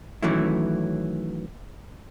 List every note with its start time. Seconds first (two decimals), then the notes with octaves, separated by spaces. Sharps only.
0.22 D#3 E3 F#3 A3 C#4 E4